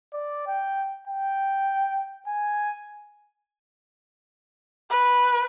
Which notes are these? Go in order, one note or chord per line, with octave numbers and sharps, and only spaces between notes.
D5
G5
G5
G#5
B4